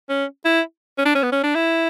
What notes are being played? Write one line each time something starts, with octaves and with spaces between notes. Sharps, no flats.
C#4
E4
C#4
D4
C#4
B3
C#4
D4
E4